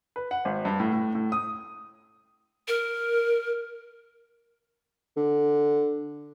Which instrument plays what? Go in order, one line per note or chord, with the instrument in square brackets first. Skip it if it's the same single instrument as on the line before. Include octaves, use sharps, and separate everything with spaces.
[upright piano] B4
F#5
G#1
G2
A2
A2
A2
D#6
[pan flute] A#4
[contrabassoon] D3